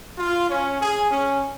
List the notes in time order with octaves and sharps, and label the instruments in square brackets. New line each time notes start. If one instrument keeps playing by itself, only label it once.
[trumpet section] F4
C#4
G#4
C#4